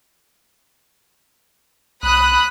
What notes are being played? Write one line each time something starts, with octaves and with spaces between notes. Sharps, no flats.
C2 B5 D#6 F#6